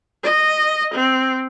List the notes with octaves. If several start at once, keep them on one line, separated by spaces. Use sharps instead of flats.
D#5
C4